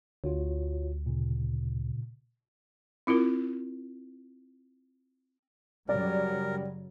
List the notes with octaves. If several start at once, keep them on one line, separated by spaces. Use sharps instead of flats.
D2 F4 F#4 C#5
A#2 C#3
C4 E4 F4 A#4
F#2 C#3 F#3 G3 A#4 D5